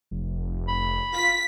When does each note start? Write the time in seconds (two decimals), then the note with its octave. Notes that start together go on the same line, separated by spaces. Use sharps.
0.11 F1
0.68 B5
1.13 F4 B6